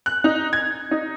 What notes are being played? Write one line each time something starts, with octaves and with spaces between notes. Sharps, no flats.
F#6
D#4
G#6
D#4